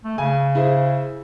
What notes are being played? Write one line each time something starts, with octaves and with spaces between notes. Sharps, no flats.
A3
C#3 G#5
E4 G#4 C5